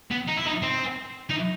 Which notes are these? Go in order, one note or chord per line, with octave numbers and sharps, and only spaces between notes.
B3
D#4
E4
D#4
C4
D#4